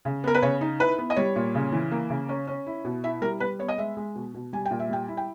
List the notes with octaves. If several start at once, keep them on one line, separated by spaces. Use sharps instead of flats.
C#3
B3 A#4
B4
C#3 C#5
D#4
E4 B4
B3
D#5
G3 C#5
A#2
C#3
E3
A#3
C#3
C#4
C#4
E4
B2
E4 E5
G3 A#4
G3 B4
B3 C#5
D#5
G#3 E5
G#3
B2
B2
G3 G#5
G5
A#2
E5
G3 G5
E4
G5